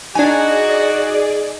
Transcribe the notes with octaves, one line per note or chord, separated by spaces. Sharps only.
D4 D#4 F#4 G#4 D5 G#5